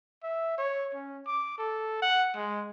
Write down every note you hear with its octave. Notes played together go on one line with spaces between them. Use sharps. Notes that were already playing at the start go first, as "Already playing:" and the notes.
E5
C#5
C#4
D6
A4
F#5
G#3